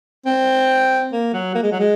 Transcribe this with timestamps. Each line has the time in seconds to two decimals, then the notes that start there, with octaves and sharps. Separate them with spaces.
0.26 C4
1.12 A#3
1.34 F#3
1.55 A#3
1.63 G#3
1.72 F#3
1.79 G#3